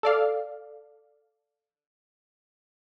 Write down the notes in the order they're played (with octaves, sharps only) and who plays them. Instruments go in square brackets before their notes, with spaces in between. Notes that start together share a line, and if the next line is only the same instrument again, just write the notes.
[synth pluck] A4 D5 F5